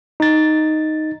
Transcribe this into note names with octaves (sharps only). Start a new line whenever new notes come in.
D#4 A6